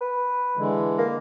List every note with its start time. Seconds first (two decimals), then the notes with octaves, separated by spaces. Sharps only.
0.01 B4
0.57 D3 E3 G#3
0.98 A#3